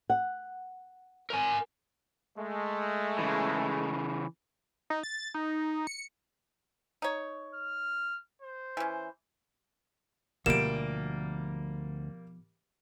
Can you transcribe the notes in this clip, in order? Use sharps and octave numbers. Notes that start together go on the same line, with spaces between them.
F#5
A#4 G#5
G#3 A3
C#3 E3
D#4
A6
D#4
C#7
D#4 C#5
F6
C5
E3 C#4
D2 B2 F3 G3 A#3 D7 E7